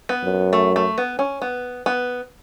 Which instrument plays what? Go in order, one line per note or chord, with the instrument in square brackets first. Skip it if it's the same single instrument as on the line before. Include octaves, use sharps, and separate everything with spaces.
[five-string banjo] B3
[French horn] F#2
[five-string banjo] A3
A3
B3
C#4
B3
B3